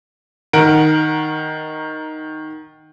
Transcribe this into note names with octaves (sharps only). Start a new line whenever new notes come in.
D#3 A#4 F#5 D7